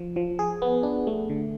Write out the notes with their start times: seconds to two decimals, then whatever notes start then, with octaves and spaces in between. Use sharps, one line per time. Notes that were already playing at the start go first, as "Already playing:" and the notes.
Already playing: F3
0.16 F3
0.39 G#4
0.62 B3
0.83 D4
1.07 A3
1.30 D3